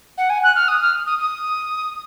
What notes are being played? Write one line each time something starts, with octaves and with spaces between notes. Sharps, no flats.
F#5
G#5
F#6
F6
D#6
F6
D#6
D#6